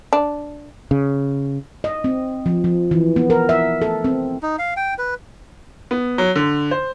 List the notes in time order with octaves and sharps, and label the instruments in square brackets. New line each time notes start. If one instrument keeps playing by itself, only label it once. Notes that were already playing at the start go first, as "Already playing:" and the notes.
[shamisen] D4
[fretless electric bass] C#3
[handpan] D#5
C4
F3
F3
E3
B3
A#4
E5
A4
C4
[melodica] D#4
F5
G5
B4
[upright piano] B3
F#3
D3
C5